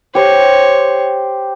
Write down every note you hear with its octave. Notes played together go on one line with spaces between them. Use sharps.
G4 C5 C#5